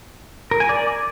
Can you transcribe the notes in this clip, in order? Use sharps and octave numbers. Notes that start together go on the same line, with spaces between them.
A#4
G#5
D5